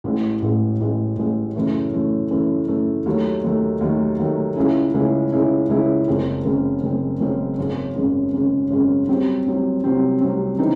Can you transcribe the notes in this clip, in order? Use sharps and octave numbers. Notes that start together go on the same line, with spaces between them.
A1 A2 G#3
A1 A2 G#3
A1 A2 G#3
A1 A2 G#3
F#2 C#3 E3 A3
F#2 C#3 E3 A3
F#2 C#3 E3 A3
F#2 C#3 E3 A3
D#2 D#3 F#3 A3
D#2 D#3 F#3 A3
D#2 D#3 F#3 A3
D#2 D#3 F#3 A3
C#2 C#3 G#3 C#4 E4
C#2 C#3 G#3 C#4 E4
C#2 C#3 G#3 C#4 E4
C#2 C#3 G#3 C#4 E4
F#1 F#2 C#3 G#3 C4
F#1 F#2 C#3 G#3 C4
F#1 F#2 C#3 G#3 C4
F#1 F#2 C#3 G#3 C4
G#1 F#2 C#3 G#3 C#4
G#1 F#2 C#3 G#3 C#4
G#1 F#2 C#3 G#3 C#4
G#1 F#2 C#3 G#3 C#4
C2 C3 F#3 C4
C2 C3 F#3 C4
C2 C3 F#3 C4
C2 C3 F#3 C4
C#3 E3 C4 D#4